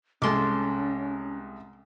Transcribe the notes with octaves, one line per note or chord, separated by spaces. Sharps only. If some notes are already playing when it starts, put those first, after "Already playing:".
C2 G#3 C#4 A4 C6 D6